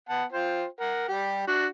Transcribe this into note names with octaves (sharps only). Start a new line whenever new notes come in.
B3 F#5 A5
F4 C5 G5
A#4 F#5
G3 G4
D4 F#4